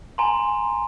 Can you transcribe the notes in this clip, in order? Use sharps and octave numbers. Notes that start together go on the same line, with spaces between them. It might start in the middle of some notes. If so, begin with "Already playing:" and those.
G#5 A#5 C6